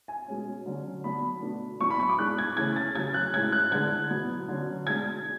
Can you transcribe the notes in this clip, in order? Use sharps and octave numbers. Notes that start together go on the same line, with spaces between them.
G#5
B2 G#3 C#4
D3 F#3 C#4
D3 F#3 B3 D4 B5
B2 A3 D4
A2 F#3 B3 D4 C#6
B5
C#6
D6
A2 G#3 B3 D4 F#6
G#6
C#3 E3 A3 C#4 G#6
A6
C#3 F#3 C#4 G#6
F#6
A2 G#3 C#4 G#6
F#6
E2 D3 G#3 D4 G#6
E2 B2 F#3 B3
D3 F#3 C#4
B2 G#3 D4 G#6